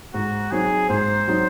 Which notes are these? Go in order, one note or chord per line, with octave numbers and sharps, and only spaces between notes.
G#2 F#4
F#3 C4 D#4 G#4
G#2 C5
F#3 C4 D#4